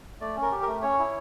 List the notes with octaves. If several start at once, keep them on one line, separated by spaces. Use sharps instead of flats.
A3 D5
C#4
A#4
G4
A#4
A3
C#4 C#5
E4